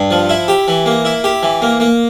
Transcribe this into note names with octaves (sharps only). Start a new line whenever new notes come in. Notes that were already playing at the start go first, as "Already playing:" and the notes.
Already playing: G2
F3
E4
G4
E3
A#3
E4
G4
E3
A#3
A#3